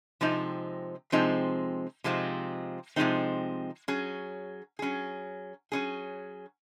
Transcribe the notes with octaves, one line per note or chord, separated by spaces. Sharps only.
C3 F3 G#3 C4 D#4
C3 F3 G#3 C4 D#4
C3 F3 G#3 C4 D#4
C3 F3 G#3 C4 D#4
F#3 C#4 G#4
F#3 C#4 G#4
F#3 C#4 G#4